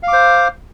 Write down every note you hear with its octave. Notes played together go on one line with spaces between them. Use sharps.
C5 F5 D6